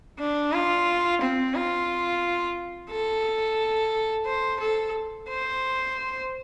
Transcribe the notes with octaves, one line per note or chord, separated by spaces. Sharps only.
D4
F4
C4
F4
A4
C5
A4
C5